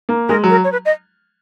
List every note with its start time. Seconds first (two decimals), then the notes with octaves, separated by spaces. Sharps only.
0.09 A#3
0.29 G#3 A#4
0.44 F#3
0.50 A#4
0.64 C#5
0.72 B4
0.85 D#5